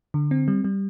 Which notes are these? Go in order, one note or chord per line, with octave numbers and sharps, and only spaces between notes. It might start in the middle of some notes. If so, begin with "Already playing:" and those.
D3
C4
G3
G3